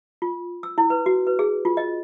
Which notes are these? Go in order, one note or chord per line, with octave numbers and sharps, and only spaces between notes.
F4
E6
E4
B4
F#4
B4
G#4
F4
D#5